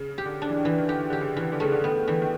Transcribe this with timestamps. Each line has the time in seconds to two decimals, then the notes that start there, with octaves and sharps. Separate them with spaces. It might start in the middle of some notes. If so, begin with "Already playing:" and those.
Already playing: C#3
0.18 G4
0.26 D3
0.42 D4
0.50 E3
0.57 D#3
0.65 E3
0.78 D#3
0.89 D3 G4
1.10 D3 G4
1.21 C#3
1.37 E3
1.52 D3
1.60 C#3 A3
1.72 D3
1.84 D#3 B3
2.07 D3 E3
2.22 D#3